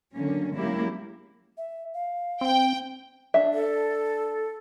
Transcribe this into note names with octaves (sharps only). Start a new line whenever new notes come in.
D3 D#3 F#3 A#3 C#4
F#3 G#3 A#3 C#4 E4 G4
E5
F5
C4 G5
D4 E5
A4